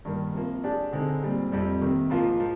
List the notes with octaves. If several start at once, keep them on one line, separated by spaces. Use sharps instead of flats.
G2 D#3 A#3
C3 F3 A#3 F4
G#3 D4 G4 D5
D3 G#3 C4 D#4
A#2 G3 C4
F2 C3 G3
C3 D#3 A#3
G#2 F3 A#3 F4
F3